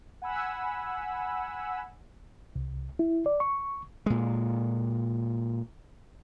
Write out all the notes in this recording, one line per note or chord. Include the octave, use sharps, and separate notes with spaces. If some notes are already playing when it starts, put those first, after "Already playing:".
F#5 G#5 B5 E6
C2
E4
D5
C#6
A#2 G#3